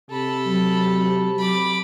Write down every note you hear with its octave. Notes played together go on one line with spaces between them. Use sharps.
C3 A4 B5
F#3
B5 D6